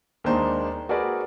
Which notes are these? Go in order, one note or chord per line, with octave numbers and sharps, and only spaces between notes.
D#2 D#3 G#3 D4 C5 A#5
F#4 G#4 A#4 B4 D5